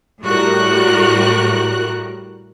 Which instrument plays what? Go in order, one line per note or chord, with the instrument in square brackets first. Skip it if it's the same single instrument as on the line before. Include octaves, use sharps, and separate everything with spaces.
[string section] A2 G3 F#4 A#4 F#6